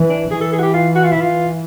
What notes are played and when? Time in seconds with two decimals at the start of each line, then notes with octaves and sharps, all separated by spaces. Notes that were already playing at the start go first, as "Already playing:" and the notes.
Already playing: E3
0.09 D4
0.30 E3 G#4
0.41 A4
0.53 G#4
0.59 F#4
0.63 G4
0.74 F4
0.95 F#4
1.04 F4
1.12 E3 E4
1.21 F4